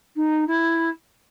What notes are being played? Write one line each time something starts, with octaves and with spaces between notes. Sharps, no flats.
D#4
E4